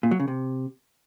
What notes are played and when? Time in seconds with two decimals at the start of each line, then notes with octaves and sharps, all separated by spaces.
0.03 A#2
0.11 F#3
0.20 C#3
0.28 C3